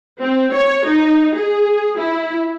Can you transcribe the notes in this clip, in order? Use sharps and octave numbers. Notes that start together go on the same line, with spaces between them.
C4
C#5
D#4
G#4
E4